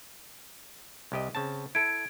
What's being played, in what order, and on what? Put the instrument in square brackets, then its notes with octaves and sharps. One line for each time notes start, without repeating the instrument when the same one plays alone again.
[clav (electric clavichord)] C2 G4 D#5
C#3 C4 A5
[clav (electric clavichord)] E4 A4 [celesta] G#6 D7